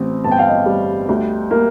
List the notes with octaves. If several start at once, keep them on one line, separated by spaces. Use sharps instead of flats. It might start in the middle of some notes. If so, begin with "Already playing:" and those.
Already playing: A1 C4
G1 A5
G5
F5
D#5 G5
G3
D2
A#3